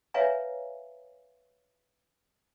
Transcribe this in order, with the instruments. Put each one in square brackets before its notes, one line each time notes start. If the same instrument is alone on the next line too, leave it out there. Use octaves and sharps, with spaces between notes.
[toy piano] B4 C#5 E5 F5 G#5 A#5